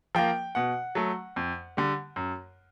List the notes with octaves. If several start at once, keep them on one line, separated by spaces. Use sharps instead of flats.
F3 A#3 G5
B2 F#5
F#3 A3
F2
D3 G3
F#2